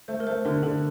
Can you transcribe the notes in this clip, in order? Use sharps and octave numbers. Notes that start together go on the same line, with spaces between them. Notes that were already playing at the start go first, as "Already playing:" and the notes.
A3 C5
A#4
A3 C5
D3 A#4
D3 A4